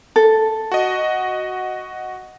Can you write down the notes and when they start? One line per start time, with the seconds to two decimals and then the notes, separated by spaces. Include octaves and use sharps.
0.16 A4
0.72 F#4 D#5